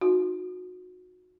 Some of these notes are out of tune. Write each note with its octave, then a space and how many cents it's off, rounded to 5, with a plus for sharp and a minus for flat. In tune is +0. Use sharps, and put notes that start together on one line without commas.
D#4 +0 F#4 -30